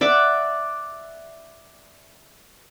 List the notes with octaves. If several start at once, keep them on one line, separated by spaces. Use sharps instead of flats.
D5 E5 F#5 D6